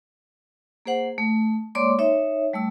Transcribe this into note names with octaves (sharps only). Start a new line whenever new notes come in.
A#3 G#4 C5 F#5
A3
G#3 A#3 C#5 D5 C6 D6
D#4 C#5 E5
G3 A3 E6